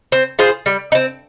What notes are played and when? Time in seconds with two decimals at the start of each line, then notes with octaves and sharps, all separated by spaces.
0.12 C4
0.39 F4 G#4 C5
0.66 G3
0.92 D#4
0.95 C4